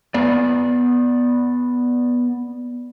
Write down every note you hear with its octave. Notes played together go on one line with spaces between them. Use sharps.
B3 D5